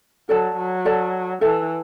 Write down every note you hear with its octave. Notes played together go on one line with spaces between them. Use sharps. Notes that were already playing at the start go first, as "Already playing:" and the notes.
F#3 A4 D5 A5
F#3
A4 D5 A5
E3 A4 E5 A5